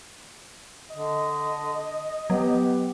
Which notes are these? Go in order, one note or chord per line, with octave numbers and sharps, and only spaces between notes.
D3 D#5
F#3 B3 G4